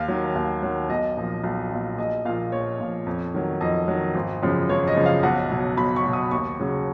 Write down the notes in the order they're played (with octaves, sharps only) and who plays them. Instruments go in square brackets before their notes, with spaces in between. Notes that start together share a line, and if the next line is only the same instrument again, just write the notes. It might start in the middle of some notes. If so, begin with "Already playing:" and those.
Already playing: [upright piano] D#2 F5
D#3 F#3
D#2
D#3 F#3
B1 D#5
A#2 F3
B1
A#2 F3
A#1 D#5
A#2 F3 F5
A#1 C#5
A#2 F3
F2
D#3 F#3
F2 D#5
D#3 F#3
G#1
F#2 C#3 F3
G#1 C#5
D#5
F#2 C#3 F3
F5
B1 F#5
B2 F#3
B1 B5
C#6
B2 F#3
D#6
D#2 C#6
C#3 F#3